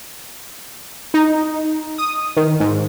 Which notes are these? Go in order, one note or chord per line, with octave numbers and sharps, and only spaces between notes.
D#4
D#6
D#3
G#2